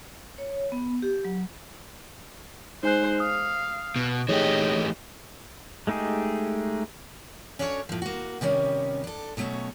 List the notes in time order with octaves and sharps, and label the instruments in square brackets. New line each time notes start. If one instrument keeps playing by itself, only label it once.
[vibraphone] C#5
B3
G4
F#3
[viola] G#3 C5 [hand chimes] D#4 G#5 F#6
[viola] F5 [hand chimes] D#6
[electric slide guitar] B2
[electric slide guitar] E3 A3 G4 [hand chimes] D#4 G#4 C#5 [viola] D#5
[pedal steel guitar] G#3 A3 D#4 G4 G#4
[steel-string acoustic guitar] C#4 D4 F#4 A4 C5 C#5
A2 F3
A#3 F#4
C3 D#3 G3 C#4
D4 A4
B2 F#3 A3 C4 C#4